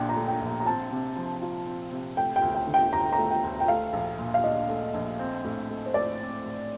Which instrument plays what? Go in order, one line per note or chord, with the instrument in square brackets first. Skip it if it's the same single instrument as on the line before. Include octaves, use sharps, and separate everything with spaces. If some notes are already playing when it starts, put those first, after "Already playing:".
Already playing: [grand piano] A#1 A#2 D4 [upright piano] G5
[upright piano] A#5
[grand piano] A3
[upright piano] G5
[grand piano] A#1
[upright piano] A#5
A#5
[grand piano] C4 [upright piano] A5
[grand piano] C3
F3
F4
C4
C3
[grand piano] A3 [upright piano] G5
[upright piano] G5
[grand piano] D2
[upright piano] G5
[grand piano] D3
[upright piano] G5
[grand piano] D2 [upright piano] A#5
[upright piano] A#5
[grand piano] A3
[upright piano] G5
[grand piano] D2
[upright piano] G5
[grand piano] A3 [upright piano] F5
[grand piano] A#1
A#2
[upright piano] F5
[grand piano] D4 [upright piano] D#5
[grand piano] A3
A#1
C4
A2
A3
[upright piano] C5
[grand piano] A2 [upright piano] D5
[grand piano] C4
A2